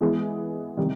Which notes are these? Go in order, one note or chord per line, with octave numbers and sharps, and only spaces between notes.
E3 G#3 B3 E4 G#4
C3 D#3 G3